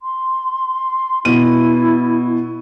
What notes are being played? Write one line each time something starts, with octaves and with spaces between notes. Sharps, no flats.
C6
B2 E4 D#7